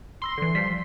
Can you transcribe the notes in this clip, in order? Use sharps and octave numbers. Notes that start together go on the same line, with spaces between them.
B5 C6 E6 A#6
D3 E3
F3 G3 B6